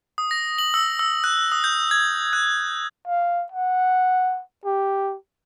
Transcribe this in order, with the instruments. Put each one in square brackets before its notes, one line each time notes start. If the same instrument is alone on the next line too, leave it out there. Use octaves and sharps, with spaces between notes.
[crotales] D#6
A#6
F#7
E6
E6
F#6
D#6
G6
G#6
F#6
[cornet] F5
F#5
G4